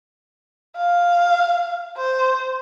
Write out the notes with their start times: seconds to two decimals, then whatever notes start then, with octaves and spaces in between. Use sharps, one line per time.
0.76 F5
1.97 C5